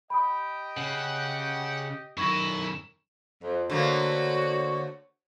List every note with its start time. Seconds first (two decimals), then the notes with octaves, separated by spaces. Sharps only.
0.10 G4 D#5 G5 B5 D#6
0.77 C#3 F#5
2.17 F#2 D#3 E4 C#6 G#6 A#6
3.42 F2
3.70 D3 A3 A#3 F#4 C5 C#5